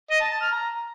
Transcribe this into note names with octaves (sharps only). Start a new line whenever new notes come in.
D#5
A5
A5
F6
A#5